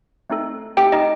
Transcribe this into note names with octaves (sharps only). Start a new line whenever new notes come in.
A3 C4 D#4 A4
A3 C4 D#4 G4 A4 G5
D#4 D#5